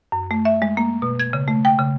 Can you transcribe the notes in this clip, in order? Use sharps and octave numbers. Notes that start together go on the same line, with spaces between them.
F#2
A3
E5
G#3
A#3
B2
G#6
C#3
A3
G5
C#3